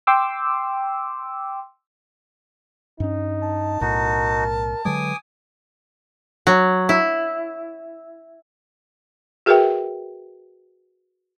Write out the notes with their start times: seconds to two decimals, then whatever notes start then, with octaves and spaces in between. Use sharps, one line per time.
0.07 G5 C6 D6 E6
3.00 G2 C#4 D#4
3.42 A5
3.81 B1 A2 D#4 F#4 A#4
4.85 D3 F#3 G#3 B4 G#5 D6 D#6
6.47 F#3
6.89 E4
9.46 F#4 G#4 A#4 B4 E5 G5